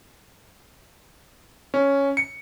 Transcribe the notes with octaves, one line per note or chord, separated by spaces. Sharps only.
C#4
C#7